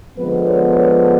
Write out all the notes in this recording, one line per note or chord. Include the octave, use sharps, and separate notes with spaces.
D3 F3 G#3 B3 B4
C#5
C#5